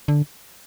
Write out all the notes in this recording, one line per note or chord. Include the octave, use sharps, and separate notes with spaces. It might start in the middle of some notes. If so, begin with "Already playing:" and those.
D3